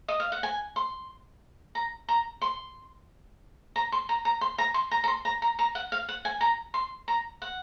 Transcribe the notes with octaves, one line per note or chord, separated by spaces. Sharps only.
D#5
F5
F#5
G#5
C6
A#5
A#5
C6
A#5
C6
A#5
A#5
C6
A#5
C6
A#5
A#5
C6
A#5
A#5
A#5
F#5
F5
F#5
G#5
A#5
C6
A#5
F#5